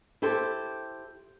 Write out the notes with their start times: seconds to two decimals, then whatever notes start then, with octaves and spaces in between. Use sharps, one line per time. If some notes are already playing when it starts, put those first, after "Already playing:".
0.22 E4 G4 A4 C5